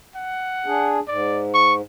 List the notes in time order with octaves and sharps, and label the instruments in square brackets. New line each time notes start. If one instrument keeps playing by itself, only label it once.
[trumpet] F#5
[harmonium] D4 G#4
[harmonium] G#2 [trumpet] D5
[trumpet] C#6